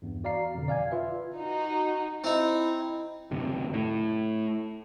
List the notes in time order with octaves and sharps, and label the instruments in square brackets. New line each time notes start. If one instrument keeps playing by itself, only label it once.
[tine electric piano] E2 G2
F#4 D5 F5 A#5 C7
F2 B2 D3
D5 F5 G#5 G#6
F4 B4 E5
[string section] D#4 F#4
[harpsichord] C4 D#4 [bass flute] E4
[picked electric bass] F#1 D#2 C3
A2